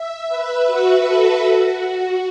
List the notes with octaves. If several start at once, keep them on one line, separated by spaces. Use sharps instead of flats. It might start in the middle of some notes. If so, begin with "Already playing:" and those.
Already playing: E5
B4
F#4
A4
F#4